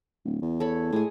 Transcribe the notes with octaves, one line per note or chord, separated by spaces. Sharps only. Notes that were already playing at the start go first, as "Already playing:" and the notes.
D1
E2
A4 C#5 B5
A2 G#3 G#4